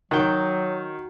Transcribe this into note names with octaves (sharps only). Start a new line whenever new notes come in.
D#3 F#3 F#4 G5